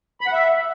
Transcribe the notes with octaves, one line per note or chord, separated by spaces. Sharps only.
B5
F#5
E5